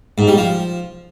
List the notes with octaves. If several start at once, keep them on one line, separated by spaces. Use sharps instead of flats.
G#2
G3
F3